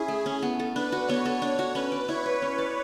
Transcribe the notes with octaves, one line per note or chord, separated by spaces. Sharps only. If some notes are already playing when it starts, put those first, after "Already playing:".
Already playing: C#4 E4 G#4
A3
C#4
B3
A4
D4 B4
F#4
B3 C#5
A4
D4 C#5
F#4
C#4 B4
D5
E4 C#5
B4
C#4
D5